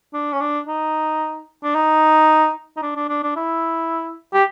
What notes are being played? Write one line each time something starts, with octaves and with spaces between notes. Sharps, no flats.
D4
C#4
D4
D#4
D4
D#4
D#4
D4
D4
D4
D4
E4
G4